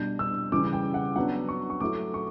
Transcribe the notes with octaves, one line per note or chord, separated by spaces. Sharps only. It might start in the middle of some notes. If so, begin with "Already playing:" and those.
Already playing: B2 G3 D4 G6
E6
C#3 E3 G3 D6
G5
F#5
F#3 B3 D4 F#5
C#6
C#6
F#3 A3 E4 D6
C#6